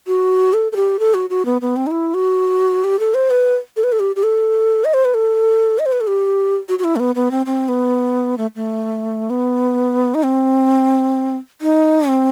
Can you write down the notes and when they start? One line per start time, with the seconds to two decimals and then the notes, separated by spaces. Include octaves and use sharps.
0.07 F#4
0.53 A4
0.72 A4
0.76 G4
0.99 A4
1.14 F#4
1.30 F#4
1.45 B3
1.61 B3
1.76 C4
1.87 D#4
1.91 E4
2.14 F#4
2.84 G4
2.99 A4
3.14 C5
3.30 B4
3.77 A4
3.84 B4
3.92 A4
4.00 G4
4.16 G4
4.23 A4
4.85 D#5
4.94 C5
5.05 B4
5.14 A4
5.79 D#5
5.86 C5
5.92 B4
6.01 A4
6.07 G4
6.69 F#4
6.79 F#4
6.84 E4
6.96 A3
7.00 B3
7.15 B3
7.31 C4
7.46 C4
7.68 B3
8.38 A3
8.56 A3
9.30 B3
10.15 D#4
10.23 C4
11.61 D#4
12.08 C4